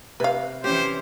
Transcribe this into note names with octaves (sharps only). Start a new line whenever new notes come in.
C3 B4 F5
E3 C#4 G4 C5